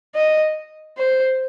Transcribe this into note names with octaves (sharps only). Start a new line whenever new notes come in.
D#5
C5